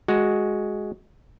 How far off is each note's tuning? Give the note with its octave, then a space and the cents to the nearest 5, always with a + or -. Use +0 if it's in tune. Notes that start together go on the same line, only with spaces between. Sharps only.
G#3 +5 F#4 +0